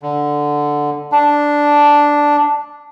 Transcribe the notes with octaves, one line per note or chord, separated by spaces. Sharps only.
D3
D4